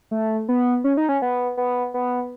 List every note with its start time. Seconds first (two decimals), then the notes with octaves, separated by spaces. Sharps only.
0.11 A3
0.49 B3
0.84 C#4
0.97 D#4
1.09 C#4
1.22 B3
1.57 B3
1.94 B3